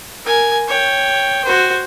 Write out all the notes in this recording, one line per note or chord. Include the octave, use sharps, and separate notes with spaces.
A#4 G#5
C#5 G5
F#4 C5